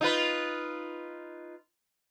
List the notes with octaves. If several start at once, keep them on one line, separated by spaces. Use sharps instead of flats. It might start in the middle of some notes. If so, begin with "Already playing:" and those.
D#4 F4 B4